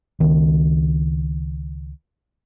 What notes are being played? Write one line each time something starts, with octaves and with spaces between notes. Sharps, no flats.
C#2 D#3